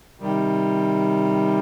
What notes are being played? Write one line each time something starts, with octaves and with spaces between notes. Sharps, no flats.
C3 D#3 G3